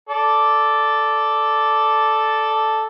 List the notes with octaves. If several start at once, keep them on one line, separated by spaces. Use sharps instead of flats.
A4 D5